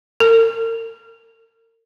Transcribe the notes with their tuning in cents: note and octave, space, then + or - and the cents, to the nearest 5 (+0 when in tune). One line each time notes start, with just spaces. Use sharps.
A#4 -40